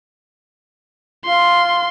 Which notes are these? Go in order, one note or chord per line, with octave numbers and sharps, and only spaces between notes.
F4 C6